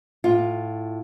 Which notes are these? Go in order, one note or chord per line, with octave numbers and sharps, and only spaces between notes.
A2 F4